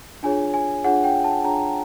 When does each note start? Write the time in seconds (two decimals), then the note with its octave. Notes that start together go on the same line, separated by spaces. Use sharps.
0.23 D4 F4 G#4 C#5 G#5
0.54 G#5
0.84 D4 F4 G#4 C#5 F#5
1.04 G5
1.24 A5
1.44 D4 F4 G#4 C#5 A#5